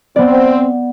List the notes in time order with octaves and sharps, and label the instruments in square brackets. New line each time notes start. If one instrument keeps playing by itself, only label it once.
[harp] B3 D5 [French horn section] C4